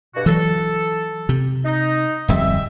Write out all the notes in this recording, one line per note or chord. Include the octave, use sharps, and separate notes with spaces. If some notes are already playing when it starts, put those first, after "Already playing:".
G2 B2 F#4
E3 F#3 A4
C3
D#4
D1 F2 G3 G#3 C4 E5